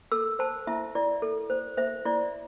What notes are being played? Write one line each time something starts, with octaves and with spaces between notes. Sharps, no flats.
A4 E6
C5 A5
E4 E5
E4 D5
A4
C5
C5 E5
E4 D5